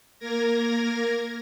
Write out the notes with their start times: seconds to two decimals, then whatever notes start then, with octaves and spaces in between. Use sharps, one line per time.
0.19 A#3 A#4 G#6 A#6